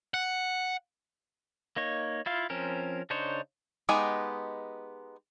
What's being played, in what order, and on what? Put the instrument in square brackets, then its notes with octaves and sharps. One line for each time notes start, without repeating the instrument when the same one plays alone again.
[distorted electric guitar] F#5
[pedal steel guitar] A#3 D#4 C#5
E4 F4 F5
F3 C4 C#4 A#4
C#3 D4 D#4 C5 C#5
[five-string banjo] G#3 B3 D#4 G4 G#5